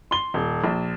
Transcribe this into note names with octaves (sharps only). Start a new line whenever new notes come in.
C6 G7
D#1
A#1